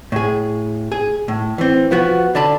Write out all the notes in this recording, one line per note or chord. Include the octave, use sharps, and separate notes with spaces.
A2 G#4
G#4
A2
E3 C4
F3 B3 F#4
D3 D5 A5 B5